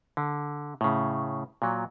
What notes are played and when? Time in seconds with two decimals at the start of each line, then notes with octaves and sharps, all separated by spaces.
0.17 D3
0.81 A2 C#3
1.62 A#2 F#3